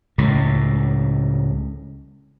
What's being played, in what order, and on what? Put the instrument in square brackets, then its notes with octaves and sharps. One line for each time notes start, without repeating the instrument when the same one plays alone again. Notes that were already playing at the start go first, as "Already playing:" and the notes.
[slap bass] C#2 A2